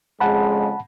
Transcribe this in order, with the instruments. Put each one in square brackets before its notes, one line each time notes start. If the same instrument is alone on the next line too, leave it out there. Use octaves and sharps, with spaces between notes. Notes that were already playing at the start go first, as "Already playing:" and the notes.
[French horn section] F2 C#3 G#3 [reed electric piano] F#5 A5 B5